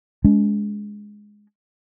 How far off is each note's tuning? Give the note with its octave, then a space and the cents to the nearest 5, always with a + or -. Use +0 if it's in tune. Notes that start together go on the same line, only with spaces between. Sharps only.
G#3 +0 C#4 +45